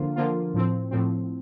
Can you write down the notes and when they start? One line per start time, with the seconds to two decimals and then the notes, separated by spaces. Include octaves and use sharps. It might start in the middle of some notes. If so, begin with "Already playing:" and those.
Already playing: D3 F3 A#3 F4
0.16 D3 F3 A#3 F4
0.54 A2 F3 C4
0.91 A2 F3 C4